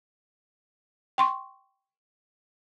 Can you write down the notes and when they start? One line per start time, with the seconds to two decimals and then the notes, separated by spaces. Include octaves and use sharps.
1.18 G5 C6 C#6